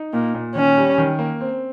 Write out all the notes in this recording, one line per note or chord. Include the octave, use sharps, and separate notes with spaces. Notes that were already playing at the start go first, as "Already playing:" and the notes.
Already playing: D#4
A#2 A#3
A#2
D#3 C#4
G3
D#3
A#3
C4